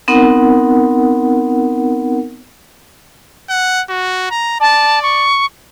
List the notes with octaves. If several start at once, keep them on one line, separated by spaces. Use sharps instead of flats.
B3 C4 D#4 A#4 F#5
F#5
F#4
A#5
D5 A5
C#6